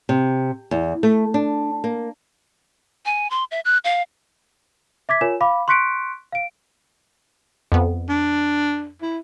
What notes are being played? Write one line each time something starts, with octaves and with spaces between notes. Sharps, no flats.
C3
E2
A3
D4
A#3
G#5
C6
E5
F#6
F5
E5 D6 G#6 B6
F4 A#4 C#5 G#5 E7
F5 B5 D6
C6 C#6 F#6 B6 C#7 D7
F5 D7
F2 B3
D4
E4